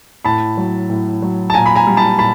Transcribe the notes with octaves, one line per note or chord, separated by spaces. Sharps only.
A2 A5 B5
F#3
A2
F#3
A5
A#2 G#5 A#5
B5
G#5 A#5
G3
A5 B5
A#2 A5 B5